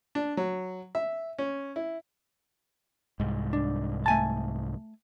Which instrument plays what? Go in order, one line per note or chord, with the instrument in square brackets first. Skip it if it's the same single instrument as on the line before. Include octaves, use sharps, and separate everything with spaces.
[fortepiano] D4
F#3
E5
C#4
E4
[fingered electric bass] C2 G#2
[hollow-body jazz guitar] D4
A3 G#5 A5